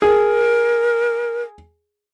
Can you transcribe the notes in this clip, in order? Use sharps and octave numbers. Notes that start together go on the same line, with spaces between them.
G#4 A#4